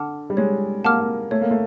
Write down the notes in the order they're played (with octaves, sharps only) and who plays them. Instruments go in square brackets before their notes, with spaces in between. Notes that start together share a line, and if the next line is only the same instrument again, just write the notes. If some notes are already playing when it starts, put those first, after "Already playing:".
Already playing: [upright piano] D3 [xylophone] F#5 A5 D6 F6
[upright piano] G3
[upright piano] G#3 [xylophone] C#5
[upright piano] A#3 [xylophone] F#5 A5 D6 F6
[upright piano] A#3
[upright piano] A3 [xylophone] C#5
[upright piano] A#3
A3